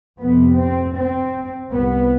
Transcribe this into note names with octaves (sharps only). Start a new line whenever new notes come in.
F2 C3 B3
C4
C4
C2 C3 B3